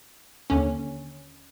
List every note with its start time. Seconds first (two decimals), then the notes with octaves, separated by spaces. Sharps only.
0.50 D#2 D3 C#4